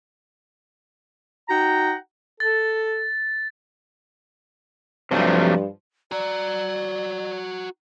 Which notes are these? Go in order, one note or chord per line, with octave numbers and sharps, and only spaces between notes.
D#4 F#4 F#5 G5 A#5
A4 A6
G2 C3 F3 F#3 A3
F#4 D5 A#5